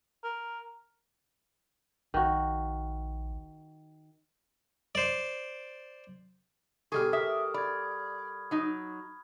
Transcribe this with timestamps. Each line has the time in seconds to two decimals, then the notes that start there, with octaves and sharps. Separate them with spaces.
0.24 A#4
2.14 A#1 D#3 F#4
4.95 C5 D5
6.92 B2 F3 G3 G#4 A4 C#6 F6
7.13 G#4 A#4 E5 D#6
7.54 D5 B5 G#6
8.51 F#3 D#4